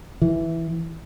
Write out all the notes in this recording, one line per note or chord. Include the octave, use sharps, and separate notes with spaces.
E3